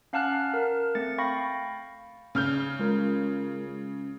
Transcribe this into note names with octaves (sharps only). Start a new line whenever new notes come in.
C#4 F5 F#5 A5 F6 F#6
A#4
A3 C4 A6 C#7
F5 G5 B5 C#6 A#6
C#3 F6 G6
G#3 F4 A#4